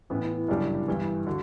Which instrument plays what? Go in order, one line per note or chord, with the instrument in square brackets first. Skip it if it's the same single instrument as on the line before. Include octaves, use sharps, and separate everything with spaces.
[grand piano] A2 E3 B3 [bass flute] C#4
[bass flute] E4
E4
[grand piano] G1 F#2 C#3 G3 D4
G2 E3 G3
[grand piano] D3 [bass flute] F#4